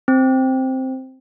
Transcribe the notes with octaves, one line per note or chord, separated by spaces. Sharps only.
C4